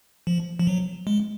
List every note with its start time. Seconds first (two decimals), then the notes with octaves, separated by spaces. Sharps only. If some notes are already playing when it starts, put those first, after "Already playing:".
0.27 F3
0.59 F3
0.67 F#3
1.07 G#3